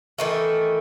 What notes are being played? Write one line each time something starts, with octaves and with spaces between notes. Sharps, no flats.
D#3 E3 A3